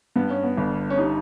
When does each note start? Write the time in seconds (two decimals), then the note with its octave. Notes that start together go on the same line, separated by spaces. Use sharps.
0.16 G2 B3
0.30 C#4
0.43 B3
0.57 G1
0.90 C#4
0.98 G3 D#4